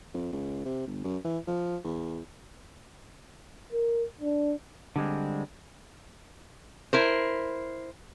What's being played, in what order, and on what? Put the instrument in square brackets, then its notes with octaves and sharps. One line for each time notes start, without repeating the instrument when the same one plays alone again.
[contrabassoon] F2
C#2
C3
G1
F#2
E3
F3
E2
[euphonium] A#4
D4
[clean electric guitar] D3 G3 G#3 C4
[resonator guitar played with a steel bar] E4 A#4 C5